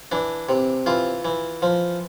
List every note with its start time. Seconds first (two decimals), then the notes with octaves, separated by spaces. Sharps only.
0.12 E3 D4
0.49 C3
0.86 E3 F4
1.25 E3
1.62 F3